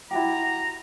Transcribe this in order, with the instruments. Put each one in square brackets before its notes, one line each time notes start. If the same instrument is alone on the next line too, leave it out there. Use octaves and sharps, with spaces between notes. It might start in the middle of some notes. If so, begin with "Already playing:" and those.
[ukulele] E4 F#4 G4 [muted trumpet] A#5